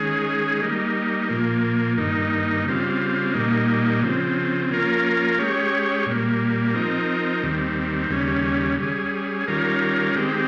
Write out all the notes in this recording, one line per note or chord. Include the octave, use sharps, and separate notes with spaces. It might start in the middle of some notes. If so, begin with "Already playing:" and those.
Already playing: D#3 G#3 C#4 G#4
G3 A#3 D#4
A#2 F3 A#3
G2 D#3 A#3 D#4
C#3 G3 C4 F4
A#2 G3 A#3 D#4
C#3 F3 C4
F3 A#3 C#4 F4 A#4
G#3 C#4 G4 C#5
A#2 G3 A#3
F3 C4 D#4 A#4
D#2 D#3 G3 C4
D#2 C#3 G3 C#4
G3 C#4 G#4
D#3 G3 C#4 F4 A#4
D#3 G#3 C4 G4